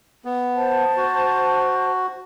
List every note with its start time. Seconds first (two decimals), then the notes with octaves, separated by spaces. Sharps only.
0.25 B3
0.55 C5 A5
0.97 F#4